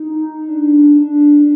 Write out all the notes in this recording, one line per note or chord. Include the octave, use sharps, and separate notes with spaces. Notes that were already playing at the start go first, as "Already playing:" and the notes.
Already playing: D#4
D4
D4